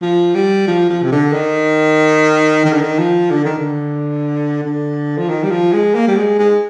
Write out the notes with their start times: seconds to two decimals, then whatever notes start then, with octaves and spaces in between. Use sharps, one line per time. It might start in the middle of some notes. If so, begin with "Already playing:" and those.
0.02 F3
0.35 G3
0.68 F3
0.90 F3
1.04 C3
1.12 D3
1.33 D#3
2.66 D#3
2.73 D3
2.81 D#3
2.99 F3
3.31 D3
3.45 D#3
3.58 D3
4.63 D3
5.18 F3
5.29 D#3
5.44 G3
5.51 F3
5.73 G#3
5.95 A#3
6.08 G3
6.17 G#3
6.39 G#3